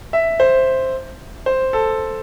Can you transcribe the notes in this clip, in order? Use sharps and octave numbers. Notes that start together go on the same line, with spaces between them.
E5
C5
C5
A4